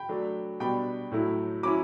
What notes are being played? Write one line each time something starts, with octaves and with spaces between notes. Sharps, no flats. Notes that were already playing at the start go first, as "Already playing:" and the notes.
Already playing: G5 B5
F#3 A3 D4
B2 G3 D4 G5 B5
A2 F#3 A3 E4
F#3 C#4 E4 B5 D6